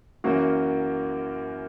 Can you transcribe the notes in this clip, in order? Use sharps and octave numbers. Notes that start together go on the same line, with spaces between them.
F#2 E3 A#3 C#4 F#4